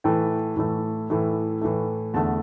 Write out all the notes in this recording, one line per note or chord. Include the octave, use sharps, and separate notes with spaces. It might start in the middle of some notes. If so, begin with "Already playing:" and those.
A2 E3 A3 G5
A2 E3 A3
A2 E3 A3
A2 E3 A3
E2 D3 A3 A5